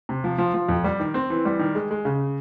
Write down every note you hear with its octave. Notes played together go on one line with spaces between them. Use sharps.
C3
F3
F3
F3
F2
G3
D#3
C4
E3
G3
D#3
G#3
G#3
C#3